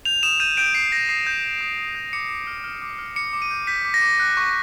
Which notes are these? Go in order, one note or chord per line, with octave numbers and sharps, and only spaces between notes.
G6 F7
D#6 E7
G6 D#7
G6 D7
G6 C7
G6 A#6
D#6 C7
G6
G6
D#6
D#6
G6
D6 C#7
D6
F6
F6
D6
F6
D6 C#7
D6
D#7
G6
G6 B6
D6
A#6
D6
F#6
C#6